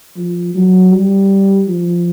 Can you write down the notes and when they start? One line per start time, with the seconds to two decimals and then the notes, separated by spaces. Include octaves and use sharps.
0.16 F3
0.55 F#3
0.92 G3
1.68 F3